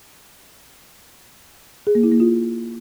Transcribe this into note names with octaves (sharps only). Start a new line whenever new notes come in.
G#4
A#3
E4
A#3
F4